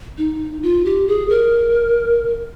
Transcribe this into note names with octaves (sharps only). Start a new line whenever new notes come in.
D#4
F4
G4
G#4
A#4